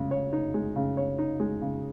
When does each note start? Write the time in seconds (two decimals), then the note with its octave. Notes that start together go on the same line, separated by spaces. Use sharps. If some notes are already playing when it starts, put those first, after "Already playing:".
Already playing: C#3 G#3
0.11 C#5
0.33 D#4
0.54 G#3
0.76 C#3
0.97 C#5
1.19 D#4
1.40 G#3
1.61 C#3